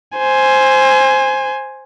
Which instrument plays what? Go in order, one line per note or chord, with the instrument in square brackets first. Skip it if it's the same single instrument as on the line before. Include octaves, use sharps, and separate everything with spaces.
[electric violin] C5 G#5